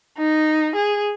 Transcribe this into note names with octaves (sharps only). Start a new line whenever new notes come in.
D#4
G#4